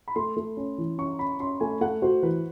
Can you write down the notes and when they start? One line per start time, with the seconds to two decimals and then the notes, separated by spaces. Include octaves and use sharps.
0.08 B5
0.16 A3 C6
0.37 A3
0.57 C#4
0.78 E3
0.98 C#4 C#6
1.19 C#4 B5
1.40 C#4 C6
1.60 A3 G#5
1.81 A3 F#5
2.02 F#4 C5
2.23 E3 B4